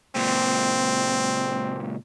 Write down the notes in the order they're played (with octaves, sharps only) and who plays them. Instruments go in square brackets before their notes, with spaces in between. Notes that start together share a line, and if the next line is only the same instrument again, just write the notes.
[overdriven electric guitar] C#2 A#2 [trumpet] C4